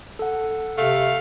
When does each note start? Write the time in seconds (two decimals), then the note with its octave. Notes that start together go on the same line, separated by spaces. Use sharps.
0.19 A4 F#5
0.78 C3 A3 F5